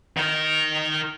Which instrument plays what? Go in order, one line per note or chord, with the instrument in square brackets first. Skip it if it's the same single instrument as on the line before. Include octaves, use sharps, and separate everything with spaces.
[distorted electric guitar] D#3 A#4